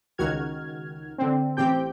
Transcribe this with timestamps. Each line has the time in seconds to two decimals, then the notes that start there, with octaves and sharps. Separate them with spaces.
0.18 C#2 D#3 F#4 F6 G#6
1.18 D3 C4
1.57 A1 C4 G4 G5 G6